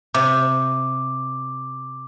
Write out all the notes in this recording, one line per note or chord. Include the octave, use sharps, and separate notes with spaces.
C3 D6